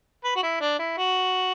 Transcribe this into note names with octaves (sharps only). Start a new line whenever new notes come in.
B4
F#4
E4
D4
E4
F#4